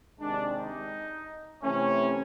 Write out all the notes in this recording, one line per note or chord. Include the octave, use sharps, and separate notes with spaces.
C3 D#3 G#3 D4
D#4
C3 E3 A3 C#4